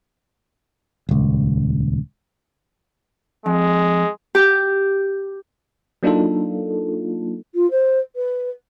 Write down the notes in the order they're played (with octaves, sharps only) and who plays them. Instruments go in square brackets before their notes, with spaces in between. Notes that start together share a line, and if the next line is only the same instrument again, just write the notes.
[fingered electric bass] D#1 C#2
[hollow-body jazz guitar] F2 [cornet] G#3
[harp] G4
[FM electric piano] F#3 A#3 D4 D#4 F4 A4
[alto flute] F4
C5
B4